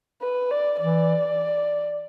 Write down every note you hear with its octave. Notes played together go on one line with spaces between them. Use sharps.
B4
D5
E3 D5